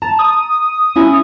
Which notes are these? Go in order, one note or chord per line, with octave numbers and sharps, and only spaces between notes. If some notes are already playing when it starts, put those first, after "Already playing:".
A5 A#5
D#6
C#4 E4 G#5